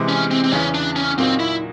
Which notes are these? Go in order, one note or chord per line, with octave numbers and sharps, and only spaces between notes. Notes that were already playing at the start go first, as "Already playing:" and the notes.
Already playing: C3 E3 G#3
C#4
C4
C4
E2 C#3 E3 C#4
D4
C#4
A#2 F#3 A#3 C4 D#4 F#4
E4